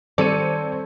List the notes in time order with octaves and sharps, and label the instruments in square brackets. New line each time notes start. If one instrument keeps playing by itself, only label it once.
[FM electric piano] D#3 G3 [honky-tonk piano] C4 C#7 D#7 [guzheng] A4 C#5 [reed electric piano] D5